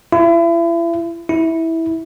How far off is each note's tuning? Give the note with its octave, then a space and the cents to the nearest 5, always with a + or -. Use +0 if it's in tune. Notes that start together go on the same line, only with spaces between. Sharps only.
E4 +35
E4 -15